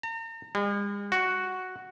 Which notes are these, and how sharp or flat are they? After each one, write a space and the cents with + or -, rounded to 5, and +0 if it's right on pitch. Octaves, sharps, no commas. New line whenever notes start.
A#5 -40
G#3 -45
F#4 +0